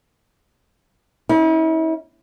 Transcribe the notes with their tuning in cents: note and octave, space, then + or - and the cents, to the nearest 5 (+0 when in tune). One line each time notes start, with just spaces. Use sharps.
C#4 +0 E4 -40